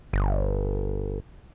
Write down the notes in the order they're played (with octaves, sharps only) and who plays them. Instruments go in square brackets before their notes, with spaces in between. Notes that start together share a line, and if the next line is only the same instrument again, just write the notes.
[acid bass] G1